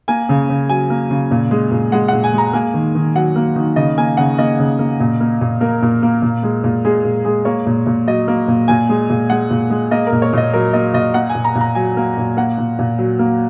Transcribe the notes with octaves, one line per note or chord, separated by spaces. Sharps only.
A#3 G#5
C#3
C#3
F#3 G#5
A#3
C#3
A#2
G#3
A#2
G#3 F#5
A#2 F#5
G#5
G#3 A#5
A#3 G#5
D#3
D#3
F#3 F#5
A#3
D#3
C#3 D#5
A#3 G#5
C#3 F#5
A#3 D#5
C#3
A#3
A#2
A#3
A#2
A#3 A#4
A#2
A#3
A#2
G#3
A#2
G#3 G#4
A#2
G#3 G#4
A#3 C#5
A#2
A#2
F#3 D#5
A#3
A#2
A#2 G#5
G#3
A#2
G#3 F#5
A#2
G#3
A#3 D#5
A#4
A#2
C#5
A#2 D#5
F#3 A#4
A#3 D#5
A#2 D#5
A#3 F#5
G#5
A#2
A#5
A#2
A#5
F#3 G#5
A#3
A#2
A#3 F#5
A#2
A#2
F#3
A#3